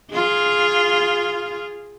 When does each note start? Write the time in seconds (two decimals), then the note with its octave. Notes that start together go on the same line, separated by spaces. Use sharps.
0.12 F4 G#4